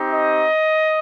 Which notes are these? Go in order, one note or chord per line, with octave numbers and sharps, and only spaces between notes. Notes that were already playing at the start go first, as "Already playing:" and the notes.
Already playing: C4 D#4 G4
D#5